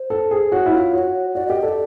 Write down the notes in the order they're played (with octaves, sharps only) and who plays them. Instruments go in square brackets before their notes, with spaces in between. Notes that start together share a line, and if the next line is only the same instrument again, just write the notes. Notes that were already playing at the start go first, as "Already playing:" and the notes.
Already playing: [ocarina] C5
[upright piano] A4
G#4
[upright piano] F#4 [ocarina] C#5
[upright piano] E4
F4
F#4
[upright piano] F#4 [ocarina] D5
[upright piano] G4 [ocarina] D#5
[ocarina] D#5
[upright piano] A4 [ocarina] D5